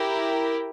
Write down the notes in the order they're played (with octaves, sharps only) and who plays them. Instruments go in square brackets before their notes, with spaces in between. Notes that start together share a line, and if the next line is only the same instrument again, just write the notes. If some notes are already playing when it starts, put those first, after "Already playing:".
Already playing: [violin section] E4 G4 A#4